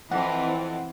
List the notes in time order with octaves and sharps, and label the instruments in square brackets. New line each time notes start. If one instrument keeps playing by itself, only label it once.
[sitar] F2 [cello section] E3 C4 [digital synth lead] F#5